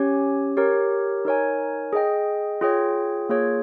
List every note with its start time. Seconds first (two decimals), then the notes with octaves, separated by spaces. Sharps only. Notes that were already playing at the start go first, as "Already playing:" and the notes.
Already playing: C#4 G4 C#5 G#5
0.57 G4 A#4 C#5
1.25 D#4 A#4 C#5 G#5
1.93 G#4 D#5 G5
2.61 F4 G#4 C#5 G5
3.29 A#3 F4 G#4 C#5